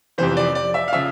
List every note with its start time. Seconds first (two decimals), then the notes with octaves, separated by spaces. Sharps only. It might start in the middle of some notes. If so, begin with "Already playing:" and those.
0.18 F2 C3 E3 C5
0.37 D5
0.55 D5
0.74 E5
0.88 F5
0.92 C#3 F3 E5